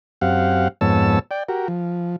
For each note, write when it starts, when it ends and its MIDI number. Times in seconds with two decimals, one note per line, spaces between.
0.21 0.68 42
0.21 0.68 60
0.21 0.68 67
0.21 0.68 77
0.21 0.68 78
0.81 1.19 41
0.81 1.19 44
0.81 1.19 59
0.81 1.19 73
0.81 1.19 81
0.81 1.19 88
1.31 1.43 74
1.31 1.43 79
1.48 1.68 66
1.48 1.68 67
1.48 1.68 70
1.68 2.16 53